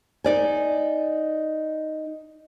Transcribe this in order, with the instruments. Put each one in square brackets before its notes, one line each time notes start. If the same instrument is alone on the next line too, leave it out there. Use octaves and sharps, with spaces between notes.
[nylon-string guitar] D#4 D5 G#5